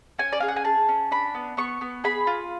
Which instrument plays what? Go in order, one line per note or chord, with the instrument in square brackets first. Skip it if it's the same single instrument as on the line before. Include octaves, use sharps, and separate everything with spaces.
[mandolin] C#4 G#5
D5
G#4 F5
F#5
G#5
G#4 A5
C#4
D4 B5
B3
B3 C#6
B3
G#4 B5
F4